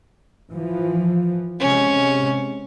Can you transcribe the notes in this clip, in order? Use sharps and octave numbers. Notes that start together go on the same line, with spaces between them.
E3 F3
C3 G#3 C#4